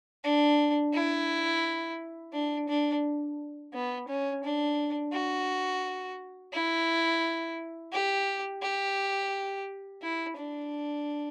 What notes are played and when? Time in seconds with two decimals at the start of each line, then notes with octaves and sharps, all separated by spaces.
0.24 D4
0.94 E4
2.33 D4
2.68 D4
3.73 B3
4.08 C#4
4.44 D4
5.13 F#4
6.53 E4
7.93 G4
8.62 G4
10.02 E4
10.37 D4